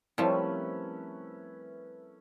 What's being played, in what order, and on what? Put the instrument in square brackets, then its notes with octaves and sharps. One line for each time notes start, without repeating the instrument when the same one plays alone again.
[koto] F3 G3 [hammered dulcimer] A3 C#4 B4 [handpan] C4 E4 A#4